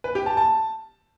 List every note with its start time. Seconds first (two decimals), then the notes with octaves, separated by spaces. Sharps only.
0.04 B4
0.15 G4
0.26 A5
0.37 A5